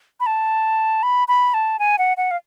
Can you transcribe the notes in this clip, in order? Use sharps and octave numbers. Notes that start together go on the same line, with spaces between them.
B5
A5
B5
B5
A5
G#5
F#5
F#5
F5